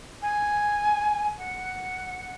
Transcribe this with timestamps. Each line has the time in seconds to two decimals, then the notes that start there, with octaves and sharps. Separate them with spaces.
0.22 G#5
1.38 F#5